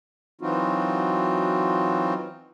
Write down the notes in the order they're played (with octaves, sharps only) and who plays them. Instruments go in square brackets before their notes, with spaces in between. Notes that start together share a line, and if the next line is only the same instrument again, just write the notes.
[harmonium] E3 F#3 C4 D#4 F4 F#4